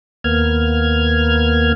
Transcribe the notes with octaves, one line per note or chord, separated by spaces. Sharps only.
D#2 A#3 B3 F6 G#6